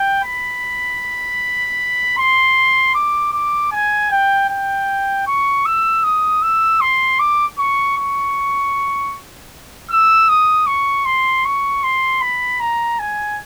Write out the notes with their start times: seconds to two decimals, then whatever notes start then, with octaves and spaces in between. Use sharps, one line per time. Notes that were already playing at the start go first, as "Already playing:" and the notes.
Already playing: G5
0.24 B5
2.18 C6
2.95 D6
3.33 D6
3.72 G#5
4.11 G5
4.49 G5
5.27 C#6
5.66 E6
6.04 D#6
6.43 E6
6.81 C6
7.20 D6
7.59 C#6
7.97 C#6
9.90 E6
10.29 D#6
10.67 C#6
11.06 C6
11.45 C#6
11.84 C6
12.22 B5
12.61 A#5
12.99 G#5